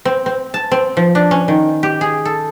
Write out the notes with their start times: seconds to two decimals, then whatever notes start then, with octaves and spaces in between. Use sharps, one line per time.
0.05 C4
0.26 C4
0.54 A5
0.72 C4
0.97 F3
1.15 D4
1.31 C#4
1.48 D#3
1.83 G4
2.01 G#4
2.25 A4